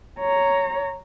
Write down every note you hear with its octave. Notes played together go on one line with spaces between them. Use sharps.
C#5 A#5